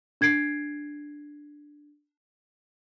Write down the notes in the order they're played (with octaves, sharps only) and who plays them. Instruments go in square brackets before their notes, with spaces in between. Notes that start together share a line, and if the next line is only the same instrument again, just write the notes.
[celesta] D4 G#6 C7 D7